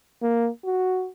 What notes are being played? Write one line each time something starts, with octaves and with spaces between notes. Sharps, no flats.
A#3
F#4